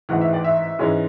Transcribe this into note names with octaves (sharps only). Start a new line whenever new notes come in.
A1 G#2 E3 F#5
E5
D5
E5
G#2 E3 G#3 C#4